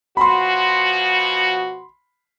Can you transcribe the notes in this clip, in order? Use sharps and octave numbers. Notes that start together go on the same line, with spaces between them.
B2 F3 F#4 B5 C6